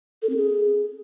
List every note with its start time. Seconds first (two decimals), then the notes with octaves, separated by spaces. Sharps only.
0.22 A4
0.29 C4
0.37 G#4